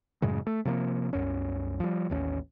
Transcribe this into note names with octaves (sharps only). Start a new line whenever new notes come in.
F#2 A2 C#3 G#3
A3
C3 F3 G#3 A#3
C2 F#2 C#4
F3 G3
A1 D#2 C#4